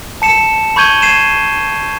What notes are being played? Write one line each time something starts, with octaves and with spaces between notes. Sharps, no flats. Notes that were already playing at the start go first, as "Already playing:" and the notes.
A5 C#7 E7
B5 C#6 G6 G#6 D#7 G7
G#6 C7 D#7 E7